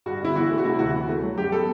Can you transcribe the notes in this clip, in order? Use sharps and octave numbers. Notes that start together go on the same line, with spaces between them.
G2 F#4
G1 E4
E3 F#4
A3
F#4
C3 E4
D2 F#4
E3
A3
F#3
F#2 G4
B3 A4